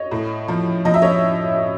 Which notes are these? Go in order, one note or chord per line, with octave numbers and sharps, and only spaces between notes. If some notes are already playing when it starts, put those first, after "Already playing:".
Already playing: C#5 D#5
A2
F3
F3 D#5
E5
C#5 D#5